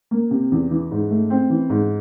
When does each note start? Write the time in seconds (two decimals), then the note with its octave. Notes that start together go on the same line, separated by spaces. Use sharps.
0.11 A#3
0.31 C3
0.52 E2
0.71 E3
0.91 G#2
1.10 A3
1.30 C4
1.50 E3
1.70 G#2